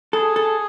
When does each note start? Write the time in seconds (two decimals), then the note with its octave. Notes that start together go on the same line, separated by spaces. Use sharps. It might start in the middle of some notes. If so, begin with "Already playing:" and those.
0.13 G#4 A4
0.36 A4